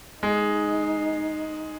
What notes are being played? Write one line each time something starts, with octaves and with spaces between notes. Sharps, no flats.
G#3 D#4